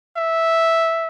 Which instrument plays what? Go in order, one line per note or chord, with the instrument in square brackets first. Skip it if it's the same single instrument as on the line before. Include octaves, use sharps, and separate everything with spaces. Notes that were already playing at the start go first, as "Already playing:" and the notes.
[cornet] E5